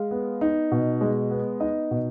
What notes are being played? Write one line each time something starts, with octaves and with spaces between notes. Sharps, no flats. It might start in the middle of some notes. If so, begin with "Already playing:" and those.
Already playing: G#3 F5
B3
D#4
B2
G#3
B3
D#4 D#5
B2